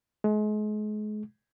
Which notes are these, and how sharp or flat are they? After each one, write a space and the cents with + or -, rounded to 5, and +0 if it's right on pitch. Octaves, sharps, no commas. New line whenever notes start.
G#3 +35